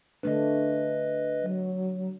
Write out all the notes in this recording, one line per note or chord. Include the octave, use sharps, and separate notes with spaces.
D3 A3 D4 B4 D#5
F#3